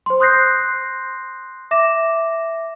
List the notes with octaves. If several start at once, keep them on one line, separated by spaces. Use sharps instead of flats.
C5 C6
C6 D#6 F#6 G6 A#6 C7
E5 D6 A#6 E7